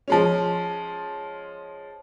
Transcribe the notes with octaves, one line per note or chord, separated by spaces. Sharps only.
F3 G#3 C#4